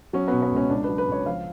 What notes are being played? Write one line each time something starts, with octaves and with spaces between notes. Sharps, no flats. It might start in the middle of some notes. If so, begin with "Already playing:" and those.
F#3 C#4
B2 B3
B3
C#2 C#4
C#2 D4
F#3 B4
B4
C#2 C#5
F3 F5